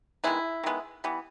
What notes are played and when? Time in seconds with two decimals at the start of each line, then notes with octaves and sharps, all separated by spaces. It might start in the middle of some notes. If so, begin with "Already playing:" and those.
0.24 D#3 G#3 B3 E4
0.64 D#3 G#3 B3
1.04 E3 G3 B3